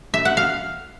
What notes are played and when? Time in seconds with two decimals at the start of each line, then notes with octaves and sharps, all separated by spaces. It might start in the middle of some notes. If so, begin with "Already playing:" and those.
0.14 E5
0.25 F#5
0.37 F5